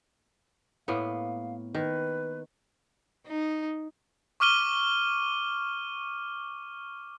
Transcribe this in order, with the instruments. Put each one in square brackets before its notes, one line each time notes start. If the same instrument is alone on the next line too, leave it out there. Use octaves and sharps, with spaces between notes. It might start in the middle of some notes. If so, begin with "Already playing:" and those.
[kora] A2 A#3 B3 [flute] F5
[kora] D#3 [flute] B4
[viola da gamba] D#4
[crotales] C#6 D6 F6 D#7 G7